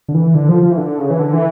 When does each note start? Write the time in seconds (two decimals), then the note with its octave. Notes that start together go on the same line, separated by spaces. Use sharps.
0.09 D3
0.14 E3
0.35 D3
0.49 F3
0.63 F3
0.72 E3
0.77 D3
0.98 C#3
1.10 E3
1.19 D3
1.33 E3